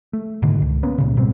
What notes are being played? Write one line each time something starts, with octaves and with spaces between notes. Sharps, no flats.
A3
G#2 B2 D3 D#3
C#2
A#3 B3 C#4
C#2 A#2 C#3
G#2 B2 G3 C4